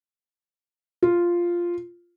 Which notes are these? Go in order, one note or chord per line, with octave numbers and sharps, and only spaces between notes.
F4